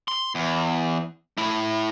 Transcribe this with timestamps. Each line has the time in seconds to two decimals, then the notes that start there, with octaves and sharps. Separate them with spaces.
0.08 C6
0.35 E2
1.38 A3 E4